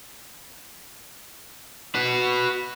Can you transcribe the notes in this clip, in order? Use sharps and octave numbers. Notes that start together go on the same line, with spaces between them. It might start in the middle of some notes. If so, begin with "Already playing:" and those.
F#4 B4